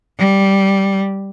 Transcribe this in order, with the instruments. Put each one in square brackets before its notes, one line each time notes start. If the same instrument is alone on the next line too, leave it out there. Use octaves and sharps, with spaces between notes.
[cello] G3